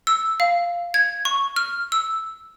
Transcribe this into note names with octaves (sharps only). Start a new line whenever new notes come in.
E6
F5
G#6
C#6
F6
E6